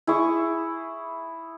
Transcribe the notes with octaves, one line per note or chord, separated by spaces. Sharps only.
E4 G#4 C#6